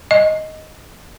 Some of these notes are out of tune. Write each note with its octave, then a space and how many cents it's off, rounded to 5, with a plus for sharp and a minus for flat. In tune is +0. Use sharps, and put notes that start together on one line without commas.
D#5 +5